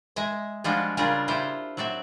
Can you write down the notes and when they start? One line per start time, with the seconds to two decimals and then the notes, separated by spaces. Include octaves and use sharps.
0.16 G#3 D#5 E5
0.64 F3 G3 G#3 D4 F4 F#4
0.97 C#3 G3 D4 F4 G#4 A#4
1.28 E4 F4 G4 C5
1.77 F#3 C4 D5 E5